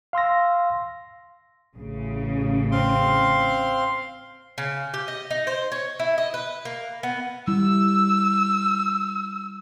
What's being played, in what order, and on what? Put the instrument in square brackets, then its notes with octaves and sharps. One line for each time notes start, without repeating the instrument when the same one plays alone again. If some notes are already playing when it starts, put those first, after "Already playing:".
[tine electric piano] F5 C6 E6 A#6
[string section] A1 C#3
[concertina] C4 F5 C6
[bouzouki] C#3
G4
D#5
D#4
C5
C#5
E4
D#5
B4
A#3
B3
[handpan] G3 E4 [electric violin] E6